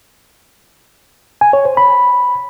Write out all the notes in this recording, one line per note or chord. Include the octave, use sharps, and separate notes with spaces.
G#5
C#5
C5
B5